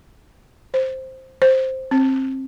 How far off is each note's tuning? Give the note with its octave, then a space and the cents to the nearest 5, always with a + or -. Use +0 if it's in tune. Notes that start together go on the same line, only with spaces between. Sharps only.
C5 +5
C5 +5
C4 +25